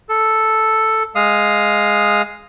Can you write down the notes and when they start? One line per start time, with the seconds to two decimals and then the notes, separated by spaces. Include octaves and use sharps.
0.09 A4
1.15 G#3 F5 D#6